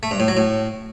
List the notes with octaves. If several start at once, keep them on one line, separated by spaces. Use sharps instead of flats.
A3
G2
A2
F#3
A2